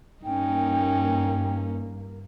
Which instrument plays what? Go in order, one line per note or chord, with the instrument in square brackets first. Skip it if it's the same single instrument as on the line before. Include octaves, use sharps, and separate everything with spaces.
[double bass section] G2 A#3 [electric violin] C#4 D#4 [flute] G5